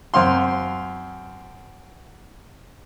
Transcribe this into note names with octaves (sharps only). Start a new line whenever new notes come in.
F#2 C4 F5 C6